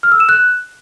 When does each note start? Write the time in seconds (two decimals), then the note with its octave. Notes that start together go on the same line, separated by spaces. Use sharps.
0.03 F6
0.12 E6
0.20 E7
0.29 F#6